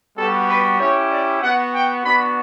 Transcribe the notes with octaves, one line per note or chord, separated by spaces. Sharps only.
G3 B3 F#4 A4
B4
C#4 E4 G4 C#5
D5
B3 F#4 F#5
G5
B3 D4 F#4 B5